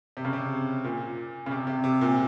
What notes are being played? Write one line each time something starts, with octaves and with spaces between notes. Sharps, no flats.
C3
C#3
C3
A#2
C#3
C3
C3
C3
A#2